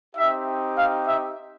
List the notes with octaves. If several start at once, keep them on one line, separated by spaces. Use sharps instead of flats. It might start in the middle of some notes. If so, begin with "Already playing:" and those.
C4 D#4 G4 E5
F5
E5